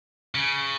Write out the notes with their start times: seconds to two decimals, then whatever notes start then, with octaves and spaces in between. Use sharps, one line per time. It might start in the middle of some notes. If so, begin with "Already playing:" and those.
0.35 C#3